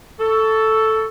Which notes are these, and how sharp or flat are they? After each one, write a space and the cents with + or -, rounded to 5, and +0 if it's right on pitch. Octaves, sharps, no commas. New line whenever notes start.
A4 +0 C#6 +20